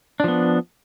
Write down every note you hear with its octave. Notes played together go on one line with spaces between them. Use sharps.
F3 B3 D4